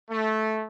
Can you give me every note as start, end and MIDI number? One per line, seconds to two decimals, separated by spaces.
0.11 0.65 57